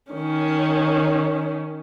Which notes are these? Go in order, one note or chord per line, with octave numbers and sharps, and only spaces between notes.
D#3 C#4